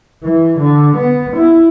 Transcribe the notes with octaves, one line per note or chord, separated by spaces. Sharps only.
E3
D3
B3
E4